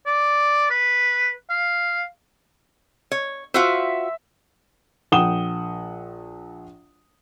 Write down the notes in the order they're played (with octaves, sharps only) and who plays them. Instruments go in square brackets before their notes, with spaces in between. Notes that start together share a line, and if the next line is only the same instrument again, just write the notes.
[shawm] D5
B4
F5
[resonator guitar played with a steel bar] C#5
[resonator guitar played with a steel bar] F4 F#4 C5 [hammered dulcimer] E5
[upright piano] A#1 F#5 G5 D#6 E7 G7